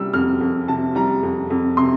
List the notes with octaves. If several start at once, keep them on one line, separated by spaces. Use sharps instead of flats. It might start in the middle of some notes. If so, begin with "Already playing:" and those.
Already playing: C3 G3 E6
F2 F6
F2
C3 A5
G3 A#5
F2
F2
C3 C6